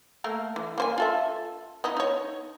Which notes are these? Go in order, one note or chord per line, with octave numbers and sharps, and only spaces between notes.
A3 A#3 A#4
E3
A#3 C5 G#5
F4 A4 E5
B3 D#4 E4
D#4 C#5